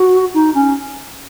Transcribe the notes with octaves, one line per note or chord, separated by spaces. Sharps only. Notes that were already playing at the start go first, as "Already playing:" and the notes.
Already playing: F#4
D#4
C#4